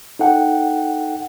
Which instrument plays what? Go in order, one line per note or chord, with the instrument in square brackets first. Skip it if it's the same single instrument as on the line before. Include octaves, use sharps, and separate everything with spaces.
[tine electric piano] D#4 A4 F#5 G5